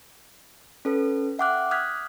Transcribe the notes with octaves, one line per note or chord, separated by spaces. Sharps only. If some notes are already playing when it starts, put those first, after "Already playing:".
C#4 A4 B4
E5 F#5 G5 D6 F6 F#6
D#6 F6 F#6 G#6 B6